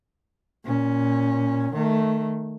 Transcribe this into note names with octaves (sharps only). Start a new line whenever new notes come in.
A#2 C#4
D#3 A3